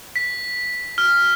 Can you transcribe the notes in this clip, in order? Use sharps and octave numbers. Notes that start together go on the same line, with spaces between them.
B6
F6